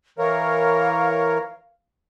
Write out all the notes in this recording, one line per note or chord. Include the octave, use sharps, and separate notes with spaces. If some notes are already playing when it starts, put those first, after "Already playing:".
E3 A#4 C#5 F5